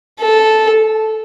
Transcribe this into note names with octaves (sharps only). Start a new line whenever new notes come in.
A4